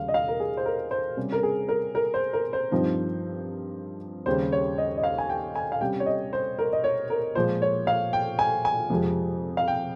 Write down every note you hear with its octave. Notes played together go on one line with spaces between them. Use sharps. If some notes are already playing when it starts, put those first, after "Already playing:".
Already playing: D#2 C#3 G3 F5
D#5
F5
A#4
G#4
C5
A#4
C5
C3 G3 C#4
A#4
G#4
A#4
A#4
C5
A#4
C5
G2 F3 C4 D#4
D#2 C#3 G3 C5
C#5
D#5
D#5
F5
G#5
G5
G#5
F5
C3 G3 C#4 G5
C#5
D#5
C5
A#4
D#5
C#5
A#4
A#2 F3 G#3 C5
C#5
F5
G5
G#5
G#5
F2 C3 F3 G#3
F5
G5